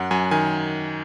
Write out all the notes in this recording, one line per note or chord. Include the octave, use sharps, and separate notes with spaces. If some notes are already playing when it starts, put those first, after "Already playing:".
Already playing: F#2 F#5
F#2 G#5
D#3 G#5